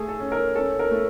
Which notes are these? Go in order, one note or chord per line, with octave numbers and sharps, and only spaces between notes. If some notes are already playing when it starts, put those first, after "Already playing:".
Already playing: A3 G#4
A4
C#4
A#4
C#4 A4
A#4
A3